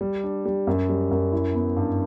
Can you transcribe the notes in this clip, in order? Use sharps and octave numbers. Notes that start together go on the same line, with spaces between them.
G3
D4
G3
F#2
G3
F#2
E4
B3
G2